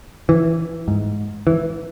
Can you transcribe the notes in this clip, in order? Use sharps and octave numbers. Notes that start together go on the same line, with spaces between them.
E3
G#2
E3